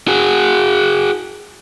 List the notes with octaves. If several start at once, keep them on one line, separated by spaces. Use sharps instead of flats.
F#4 G#4